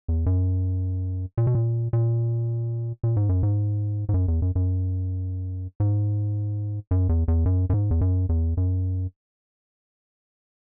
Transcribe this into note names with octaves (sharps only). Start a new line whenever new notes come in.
E2
F#2
A#2
B2
A#2
A#2
A#2
G#2
F#2
G#2
G#2
F#2
E2
F#2
F#2
G#2
F#2
E2
E2
F#2
F#2
G#2
E2
F#2
E2
F#2